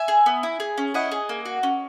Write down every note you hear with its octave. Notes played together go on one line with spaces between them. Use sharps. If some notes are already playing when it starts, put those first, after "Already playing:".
Already playing: E5 G#5
G#4
B3
E4
G#4
C#4
E4 D#5 F#5
G#4
A#3
F#4
C#4